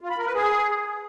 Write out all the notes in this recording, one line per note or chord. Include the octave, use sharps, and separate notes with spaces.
F4
B5
A#4
B4
G#4